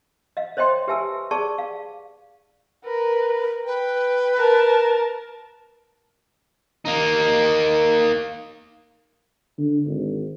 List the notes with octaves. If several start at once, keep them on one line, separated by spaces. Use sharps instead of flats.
D#5 F5
C5 C#5 D#5 E5 G5 C6
G4 B4 E5 G#5 A5 E6
G#4 D5 A5 C#6
F5
A#4 B4
B4 G5
A#4 A5
A#3 D#4
D3
G#1